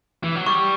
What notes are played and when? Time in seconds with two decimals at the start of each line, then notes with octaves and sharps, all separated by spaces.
0.23 E3
0.35 F#3
0.46 G3 C#6